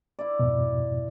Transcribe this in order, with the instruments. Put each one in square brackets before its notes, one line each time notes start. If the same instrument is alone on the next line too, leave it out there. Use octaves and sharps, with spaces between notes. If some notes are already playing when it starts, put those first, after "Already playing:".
[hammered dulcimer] E4 D5
[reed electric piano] F2 G#2 B2